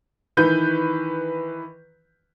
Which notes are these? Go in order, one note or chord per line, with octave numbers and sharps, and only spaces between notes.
D#3 E3 B4 G6